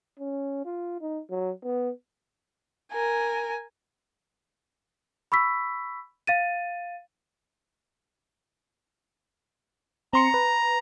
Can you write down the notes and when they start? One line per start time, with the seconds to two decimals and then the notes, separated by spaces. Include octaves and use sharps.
0.19 C#4
0.65 F4
1.01 D#4
1.30 F#3
1.64 B3
2.92 A#4 G#5
5.32 B5 C#6 E6 B6
6.27 F5 A6 D#7
10.13 C4 A#5 C6 C#7
10.34 B4